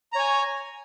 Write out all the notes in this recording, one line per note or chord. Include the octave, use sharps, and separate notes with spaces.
C#5 G#5 A#5